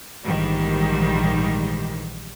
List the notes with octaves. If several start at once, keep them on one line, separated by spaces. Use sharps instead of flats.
A#1 G#2 D#3 E3 G3